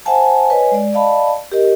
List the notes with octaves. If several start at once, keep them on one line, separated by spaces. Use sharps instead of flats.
C5 E5 F#5 G#5 A5
B4 C#5 D#5 G#5
G#3 D5
D5 D#5 F5 A5 B5
G4 A#4 D#5